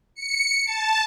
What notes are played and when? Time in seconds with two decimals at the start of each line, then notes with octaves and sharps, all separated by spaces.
0.15 C#7
0.65 A5